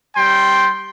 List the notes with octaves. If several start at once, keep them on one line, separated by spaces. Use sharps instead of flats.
G3 G5 C6